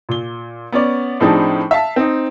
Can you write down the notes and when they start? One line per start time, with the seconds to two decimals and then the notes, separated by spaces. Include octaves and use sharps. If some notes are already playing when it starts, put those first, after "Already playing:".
0.09 A#2 G7
0.72 B3 C#4 D5
1.20 A2 F3 C4 D4 D#4 G#4
1.71 E5 F5 A5
1.96 C4 D#4